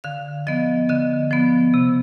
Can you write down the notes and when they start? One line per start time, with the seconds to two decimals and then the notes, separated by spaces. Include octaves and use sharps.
0.04 D3 F5
0.47 F3 B3 D#5
0.89 D3 D#5
1.31 F3 B3
1.74 C3